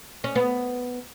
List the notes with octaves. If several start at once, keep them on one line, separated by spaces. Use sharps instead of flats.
C#4
B3